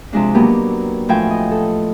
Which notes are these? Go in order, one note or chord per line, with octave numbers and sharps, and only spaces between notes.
C3 F3 G#3 D4
F#3 A#3 B3 G4
A2 F3 G5 G#5
D#5
A4